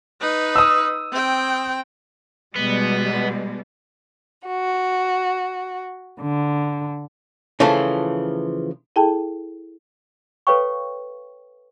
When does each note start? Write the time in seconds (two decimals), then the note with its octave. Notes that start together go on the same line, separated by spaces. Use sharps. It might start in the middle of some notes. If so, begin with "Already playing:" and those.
0.20 D#4 B4
0.56 D#6 E6
1.12 C4 G5
2.56 B2 G3 G#3 B3
4.46 F#4
6.20 D3
7.60 C#3 E3 F3 A3 F4 A4
8.96 E4 G#4 A4 G5 A5
10.47 A4 B4 C#5 F5 G5 C#6